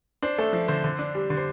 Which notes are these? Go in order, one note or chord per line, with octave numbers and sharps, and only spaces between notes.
D4 C5
A3 A4
F3
D3 C5
D3
D4
G3
D3
C5